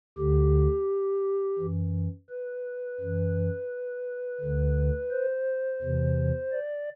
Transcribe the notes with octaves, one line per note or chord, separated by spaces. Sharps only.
D2 D3 G4
F#2 E3
B4
F#2 E3
D2 D3
C5
E2 C3 E3
D5